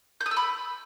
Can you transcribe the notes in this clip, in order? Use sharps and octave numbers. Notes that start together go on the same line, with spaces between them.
G6
D#6
E6
B5